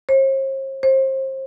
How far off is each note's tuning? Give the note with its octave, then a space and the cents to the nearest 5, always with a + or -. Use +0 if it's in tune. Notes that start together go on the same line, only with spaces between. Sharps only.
C5 +45
C5 +30